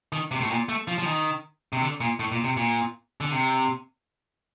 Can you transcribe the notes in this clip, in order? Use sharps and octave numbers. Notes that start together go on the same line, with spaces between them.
D#3
C3
A2
A#2
A3
F3
F3
D#3
C3
D3
A#2
A2
A#2
C3
A#2
D3
C3